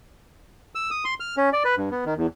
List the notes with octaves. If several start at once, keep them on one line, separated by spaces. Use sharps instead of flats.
E6
D#6
C6
F6
C#4
D5
B4
G2
B3
D#3
E2